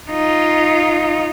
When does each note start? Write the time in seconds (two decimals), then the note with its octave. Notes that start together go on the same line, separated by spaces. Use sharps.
0.10 D#4 F4